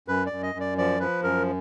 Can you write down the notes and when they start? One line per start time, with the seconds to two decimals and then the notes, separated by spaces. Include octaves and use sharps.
0.08 F#2 B4
0.26 D5
0.32 F#2
0.43 D#5
0.55 F#2
0.60 D5
0.78 F3 D5
1.00 F3 B4
1.23 F#2 A#4